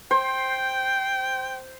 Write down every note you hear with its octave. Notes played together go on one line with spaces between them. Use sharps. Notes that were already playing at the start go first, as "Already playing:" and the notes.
C5 G5